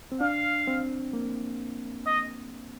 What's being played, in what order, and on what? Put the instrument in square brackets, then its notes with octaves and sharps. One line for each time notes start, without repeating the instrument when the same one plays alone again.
[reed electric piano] C4
[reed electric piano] D4 [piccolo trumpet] F5
[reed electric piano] C4
A#3
[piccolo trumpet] D#5